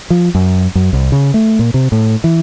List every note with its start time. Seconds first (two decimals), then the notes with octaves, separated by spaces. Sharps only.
0.10 F3
0.35 F#2
0.75 F#2
0.93 C2
1.12 C#3
1.34 A3
1.59 A#2
1.74 C3
1.92 A2
2.24 E3